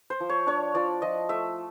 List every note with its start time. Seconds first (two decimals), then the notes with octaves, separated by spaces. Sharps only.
0.10 C5
0.20 F3
0.29 C#5
0.47 D4 C#5
0.74 F3 D5
1.02 F3 D#5
1.29 A3 E5